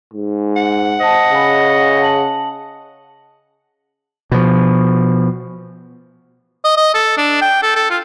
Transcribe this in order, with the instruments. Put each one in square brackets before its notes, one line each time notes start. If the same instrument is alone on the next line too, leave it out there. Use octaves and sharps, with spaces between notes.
[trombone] G#2
[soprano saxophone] F#5
[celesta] C5 A5 [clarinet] D#5
[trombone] C#3 [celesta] F5 G#5 B5
[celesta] A5 F#7
[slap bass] B2 F3
[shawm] D#5
D#5
A4
D4
G5
A4
A4
F4